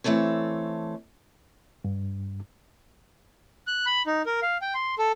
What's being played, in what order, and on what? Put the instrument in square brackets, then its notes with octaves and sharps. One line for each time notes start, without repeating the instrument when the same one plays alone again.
[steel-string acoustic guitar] E3 A3 C4 A4 C#5
[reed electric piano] G2
[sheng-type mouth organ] F#6
B5
D#4
A#4
F5
G5
C6
A4